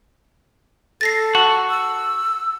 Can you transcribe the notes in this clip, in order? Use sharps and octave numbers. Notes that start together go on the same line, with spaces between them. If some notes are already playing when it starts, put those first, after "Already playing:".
A4 A6 A#6 C7
F#4 A5
E6